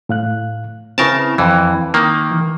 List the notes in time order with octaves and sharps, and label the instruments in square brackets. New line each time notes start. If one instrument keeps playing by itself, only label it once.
[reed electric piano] A2 F5 F#6
[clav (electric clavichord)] C#3 A#4 A5 [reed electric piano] C4 E4 B4
[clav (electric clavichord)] F2 E3
D#3 A#3
[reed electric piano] E3